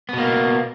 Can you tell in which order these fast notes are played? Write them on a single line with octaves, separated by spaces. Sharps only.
B3 B2 A#3